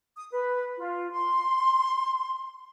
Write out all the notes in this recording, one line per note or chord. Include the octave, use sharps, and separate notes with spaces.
D#6
B4
F4
C6